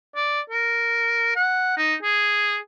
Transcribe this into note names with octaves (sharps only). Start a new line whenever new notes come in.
D5
A#4
F#5
D#4
G#4